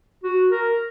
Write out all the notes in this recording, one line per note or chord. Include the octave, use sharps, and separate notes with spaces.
F#4
A#4